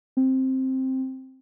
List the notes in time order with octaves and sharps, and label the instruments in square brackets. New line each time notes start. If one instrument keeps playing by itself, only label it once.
[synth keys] C4